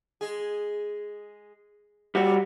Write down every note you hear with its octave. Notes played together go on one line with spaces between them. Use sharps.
G#3 G#4
G3 A#3 C4 F#4